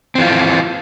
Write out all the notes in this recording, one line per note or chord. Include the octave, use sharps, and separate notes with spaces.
E3 C4 F4